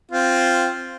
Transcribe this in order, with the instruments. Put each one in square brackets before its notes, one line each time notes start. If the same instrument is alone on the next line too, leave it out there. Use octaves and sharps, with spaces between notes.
[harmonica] C4 F4